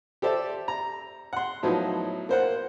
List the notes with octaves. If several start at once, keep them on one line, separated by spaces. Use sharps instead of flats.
G4 A4 C5 D5 E5
A#5
F#5 C6
A2 F3 F#3 B3 D#4
A#3 C5 F#5